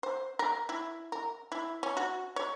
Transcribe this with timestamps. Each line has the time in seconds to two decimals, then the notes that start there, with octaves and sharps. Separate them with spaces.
0.03 C5
0.39 A#4
0.69 E4
1.12 A#4
1.52 E4
1.83 C#4
1.97 F#4
2.36 C#5